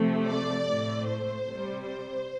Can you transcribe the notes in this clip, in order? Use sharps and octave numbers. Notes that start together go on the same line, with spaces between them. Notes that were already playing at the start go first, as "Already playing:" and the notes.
Already playing: C3 F3 A3
D5
A2 A3
C5
C3 G3
C5